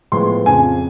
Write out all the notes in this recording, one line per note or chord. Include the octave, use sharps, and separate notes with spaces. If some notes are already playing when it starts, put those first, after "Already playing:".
A2 F3 G#3 B3 C6
F2 C#3 F3 G#5